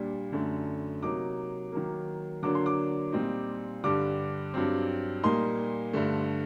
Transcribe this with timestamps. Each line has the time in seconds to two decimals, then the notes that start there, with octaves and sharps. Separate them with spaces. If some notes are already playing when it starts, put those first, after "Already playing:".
Already playing: A#2 G3 D4
0.32 F#2 D3 A3
1.02 C3 F#3 A#3 D#4 D6
1.72 D#3 F#3 A#3
2.43 D3 F#3 A#3 D4 D6
2.55 C6
2.66 D6
3.12 A#2 G3 C4 D#4
3.84 G2 D3 G3 D6
4.54 G2 F#3 C4
5.23 A#2 G3 A#3 D#4 C6
5.93 G2 D3 A3